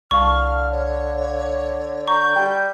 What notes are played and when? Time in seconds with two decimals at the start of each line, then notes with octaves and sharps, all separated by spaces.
0.11 C2 D3 F5 A5 C#6 F6
0.72 C#5
2.07 A#5 C#6 G6
2.36 G3 G4 G5